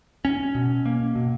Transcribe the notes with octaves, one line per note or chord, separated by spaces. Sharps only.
C#4
B2
A#3
B2